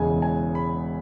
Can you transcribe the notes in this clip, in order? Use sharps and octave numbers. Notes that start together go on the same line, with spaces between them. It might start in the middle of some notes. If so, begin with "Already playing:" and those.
Already playing: E1 E2 C#3 E3 G#3 G#5
G#5
B5